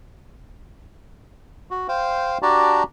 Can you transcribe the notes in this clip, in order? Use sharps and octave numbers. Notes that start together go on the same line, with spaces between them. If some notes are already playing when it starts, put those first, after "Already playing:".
F#4
C5 F5 G5
D4 F#4 G4 D5 A5 A#5